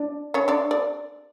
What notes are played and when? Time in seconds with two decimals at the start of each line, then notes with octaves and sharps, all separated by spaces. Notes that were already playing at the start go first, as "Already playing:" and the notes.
Already playing: D4 D5
0.34 C#4 C#5
0.48 D4 D5
0.71 D5